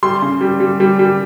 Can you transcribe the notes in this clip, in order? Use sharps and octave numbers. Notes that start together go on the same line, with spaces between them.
G3 C6
C#3
G3
G3
G3
G3